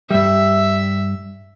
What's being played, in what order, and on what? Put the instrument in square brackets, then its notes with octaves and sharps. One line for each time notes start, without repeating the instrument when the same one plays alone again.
[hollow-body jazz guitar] G2 G3 [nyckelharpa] E5